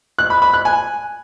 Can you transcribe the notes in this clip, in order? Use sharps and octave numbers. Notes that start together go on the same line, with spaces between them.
F#6
B5
B5
F#6
G#5